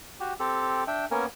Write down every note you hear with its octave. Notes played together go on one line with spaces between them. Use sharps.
F#4 G4
C4 G4 A4
D4 E5 G5
A#3 B3 C#4 A#4 G#5